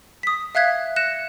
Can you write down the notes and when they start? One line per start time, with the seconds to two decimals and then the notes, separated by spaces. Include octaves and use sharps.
0.23 D#6 B6
0.55 E5 F5 F#6 G#6 B6
0.96 F#6 A#6 C#7 E7